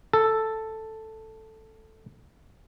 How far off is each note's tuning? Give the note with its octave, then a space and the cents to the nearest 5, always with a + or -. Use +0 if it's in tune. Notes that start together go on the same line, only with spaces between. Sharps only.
A4 +5